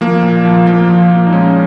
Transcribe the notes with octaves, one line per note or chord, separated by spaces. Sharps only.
F3 A#3
A#2
F3
F3 A#3
F3
A#2
D#4
G#3 C#4